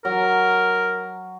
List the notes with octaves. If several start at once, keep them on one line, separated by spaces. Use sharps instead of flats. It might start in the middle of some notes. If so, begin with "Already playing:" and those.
F#3 A#4